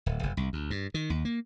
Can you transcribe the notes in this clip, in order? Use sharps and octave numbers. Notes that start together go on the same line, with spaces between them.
D1
F1
C2
D2
G2
D#3
D#2
A#3